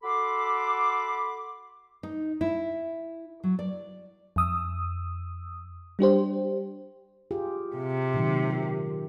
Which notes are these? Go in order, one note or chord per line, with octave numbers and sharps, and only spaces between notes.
F#4 A4 B5 C6 D6
D#4
E4
F#3
D5
F2 D#6 E6
G3 D4 G4 C5
F4 G4 G#4
C3
A#2 D#3 F#3
G4